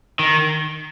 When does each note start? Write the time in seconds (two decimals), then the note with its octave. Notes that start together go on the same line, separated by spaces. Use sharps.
0.19 D#3